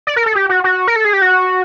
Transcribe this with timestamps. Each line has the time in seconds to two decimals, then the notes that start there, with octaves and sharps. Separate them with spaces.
0.07 D5
0.16 A#4
0.26 A4
0.35 G4
0.49 F#4
0.64 F#4
0.88 A#4
0.96 A4
1.05 G#4
1.13 G4
1.22 F#4